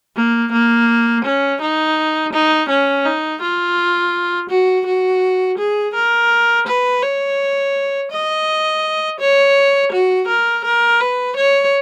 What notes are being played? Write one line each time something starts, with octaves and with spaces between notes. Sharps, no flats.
A#3
A#3
C#4
D#4
D#4
C#4
D#4
F4
F#4
F#4
G#4
A#4
B4
C#5
D#5
C#5
F#4
A#4
A#4
B4
C#5